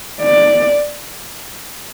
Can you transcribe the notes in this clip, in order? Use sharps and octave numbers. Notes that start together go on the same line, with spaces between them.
D5